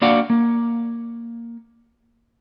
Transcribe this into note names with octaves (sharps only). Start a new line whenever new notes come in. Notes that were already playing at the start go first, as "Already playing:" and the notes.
A#3 D4 F#4 D5 F5 F#5
A#3